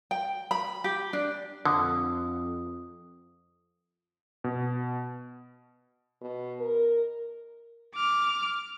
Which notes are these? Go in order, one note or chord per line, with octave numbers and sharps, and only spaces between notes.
G5
B5
G4
D4
F2 D3 D#6
B2
B2
A#4
D6 F6